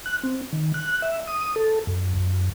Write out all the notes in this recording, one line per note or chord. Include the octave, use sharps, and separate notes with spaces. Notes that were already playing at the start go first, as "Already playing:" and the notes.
F#6
C4
D#3
F#6
E5
D#6
A4
F#2
F#2